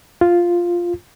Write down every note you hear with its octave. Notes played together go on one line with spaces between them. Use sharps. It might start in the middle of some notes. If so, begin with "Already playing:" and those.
F4